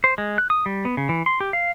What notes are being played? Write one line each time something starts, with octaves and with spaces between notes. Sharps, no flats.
C5
G#3
F#6
D#6
G3
B3
C#3
E3
C6
G4
F5